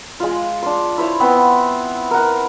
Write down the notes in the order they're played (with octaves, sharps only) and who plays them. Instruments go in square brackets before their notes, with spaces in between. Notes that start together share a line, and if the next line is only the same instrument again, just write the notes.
[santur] G#3 F4
D4 C6
E4 C5 C#5
B3 C4 C5
A#4 F#5